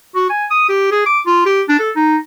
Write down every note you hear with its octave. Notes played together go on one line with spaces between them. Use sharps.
F#4
G#5
D#6
G4
G#4
D6
F4
G4
D4
A4
D#4